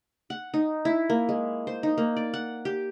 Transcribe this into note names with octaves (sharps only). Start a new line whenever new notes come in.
F#5
D#4
E4
A#3
G#3
C5
D#4
A#3
D5
F#5
G4